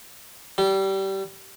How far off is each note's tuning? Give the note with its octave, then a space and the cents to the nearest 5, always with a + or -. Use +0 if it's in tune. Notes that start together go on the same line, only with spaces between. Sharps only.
G3 -20